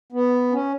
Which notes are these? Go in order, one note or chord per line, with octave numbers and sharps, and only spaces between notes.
B3
C#4